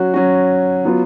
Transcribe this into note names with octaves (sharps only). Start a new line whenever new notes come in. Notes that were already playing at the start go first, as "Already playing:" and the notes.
Already playing: F#3 C#4 F#4
F#3 C#4 F#4
F#3 B3 F4